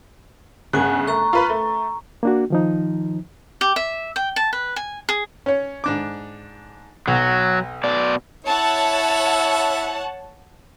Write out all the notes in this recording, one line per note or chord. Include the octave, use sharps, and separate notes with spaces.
G1 C#3 F#5 G#5 F#6
A3 A#5 C#6
F4 B4
A3
A#3 D4 F#4
D#3 F3 D#4
G4
E5
G5
A5
B4
G#5
G#4
C#4 C#5
G#2 D4 D6
B1 F#3
B2 D5
E4 C#5 E5 F#5 A5